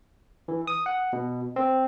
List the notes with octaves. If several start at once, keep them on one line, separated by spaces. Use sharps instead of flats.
E3
D#6
F#5
B2
C4